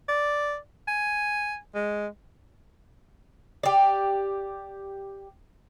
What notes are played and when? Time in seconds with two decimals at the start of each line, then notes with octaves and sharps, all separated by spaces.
0.09 D5
0.88 G#5
1.75 G#3
3.63 G4 D5